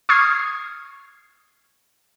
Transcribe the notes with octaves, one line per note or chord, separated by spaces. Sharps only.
C#6 D#6 F6 G#6 C7